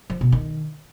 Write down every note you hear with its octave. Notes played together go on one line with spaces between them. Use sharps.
F3
B2
D#3